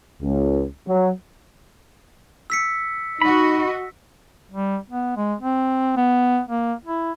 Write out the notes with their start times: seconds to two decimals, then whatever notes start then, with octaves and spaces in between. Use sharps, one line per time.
0.22 C#2
0.88 F#3
2.50 E6 B6 C#7
3.21 D#4 F#4 D#5 B5
4.51 G3
4.90 B3
5.17 G#3
5.41 C4
5.97 B3
6.49 A#3
6.86 E4